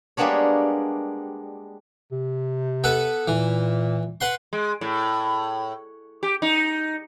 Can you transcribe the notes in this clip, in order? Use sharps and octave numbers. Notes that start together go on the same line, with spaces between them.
G3 G#3 A#3 B3 D4 C#5
C3
B3 A4 B4
A#2 E3
B4 F#5 C6
G#3
A2
G4
D#4